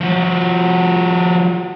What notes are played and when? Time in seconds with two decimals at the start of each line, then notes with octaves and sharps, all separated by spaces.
0.01 F3 F#4